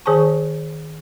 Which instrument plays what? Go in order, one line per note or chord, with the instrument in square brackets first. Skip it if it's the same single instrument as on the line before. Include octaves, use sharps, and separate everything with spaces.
[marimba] D#3 G#4 C5 G#5 A5 C#6